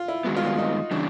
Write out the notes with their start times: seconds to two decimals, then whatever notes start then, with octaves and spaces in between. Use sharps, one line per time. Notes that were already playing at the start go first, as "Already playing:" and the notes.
Already playing: F4
0.08 E4
0.24 G2 D#3 G#3 B3 F#4
0.36 F4
0.43 F#4
0.47 F4
0.58 D#4
0.91 C#3 E3 G3 D4